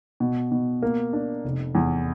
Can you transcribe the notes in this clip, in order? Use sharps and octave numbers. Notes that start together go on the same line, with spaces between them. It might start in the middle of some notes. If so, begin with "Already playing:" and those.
B2
B2
A#3
D4
F1
E2